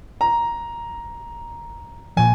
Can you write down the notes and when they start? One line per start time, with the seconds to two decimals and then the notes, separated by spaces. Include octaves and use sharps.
0.21 A#5
2.17 A#2 F3 G#5